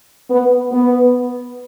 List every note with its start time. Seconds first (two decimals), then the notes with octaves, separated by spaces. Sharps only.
0.30 B3
0.72 B3